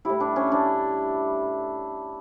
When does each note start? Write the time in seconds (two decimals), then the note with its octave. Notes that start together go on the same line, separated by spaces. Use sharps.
0.05 A2 G3 E4
0.20 D4
0.36 C#4
0.52 D4